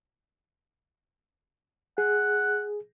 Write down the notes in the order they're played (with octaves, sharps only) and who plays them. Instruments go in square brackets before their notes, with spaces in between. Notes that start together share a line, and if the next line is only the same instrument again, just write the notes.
[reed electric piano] G#4 [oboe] F#5